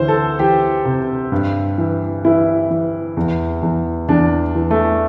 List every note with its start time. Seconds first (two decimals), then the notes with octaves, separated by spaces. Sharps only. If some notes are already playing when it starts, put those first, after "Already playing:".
Already playing: D2 E3 C5
0.08 A4
0.39 E3 G4
0.85 C3
1.32 G2
1.78 E3
2.25 E3 E4
2.71 E3
3.17 E2
3.63 E2
4.09 E2 D4
4.55 E3
4.71 A3